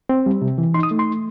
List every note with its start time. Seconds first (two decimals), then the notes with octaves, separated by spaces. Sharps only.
0.09 C4
0.26 G3
0.42 C3
0.58 E3
0.74 D#4 C6
0.83 D#6
0.91 A3
0.99 C6